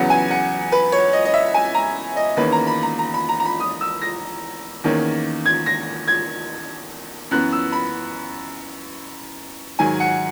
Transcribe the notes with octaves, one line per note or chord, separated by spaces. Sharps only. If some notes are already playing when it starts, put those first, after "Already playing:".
Already playing: E2 C#3 F#3 B3 F#5
G#5
F#5
B4
C#5
D#5
D#5
E5
G#5
A#5
D#5
E2 D#3 A#3 C#4 B4
A#5
B5
A#5
A#5
B5
A#5
A#5
B5
D#6
E6
A#6
E2 D#3 A#3 C#4
G#6
A#6
G#6
F#2 E3 B3 F#6
E6
B5
G#2 D#3 F#3 G#5
F#5